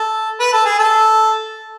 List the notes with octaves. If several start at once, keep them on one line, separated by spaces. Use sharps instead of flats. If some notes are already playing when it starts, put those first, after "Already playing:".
Already playing: A4
B4
A4
G#4
A4